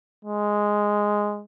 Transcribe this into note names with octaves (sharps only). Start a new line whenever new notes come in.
G#3